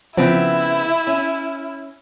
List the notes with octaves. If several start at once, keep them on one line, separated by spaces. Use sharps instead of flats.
C#3 F3 B3 C4 E4
C#4